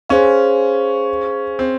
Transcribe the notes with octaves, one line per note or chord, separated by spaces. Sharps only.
C#4 G#4 C5 F5
C4